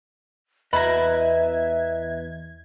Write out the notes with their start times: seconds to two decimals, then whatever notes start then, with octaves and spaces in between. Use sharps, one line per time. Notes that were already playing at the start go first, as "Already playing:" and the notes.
0.73 E2 B4 D#5 E5 A#5 B5 G#6